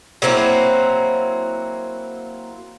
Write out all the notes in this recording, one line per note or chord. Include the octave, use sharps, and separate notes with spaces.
F#3 A#3 C4 E4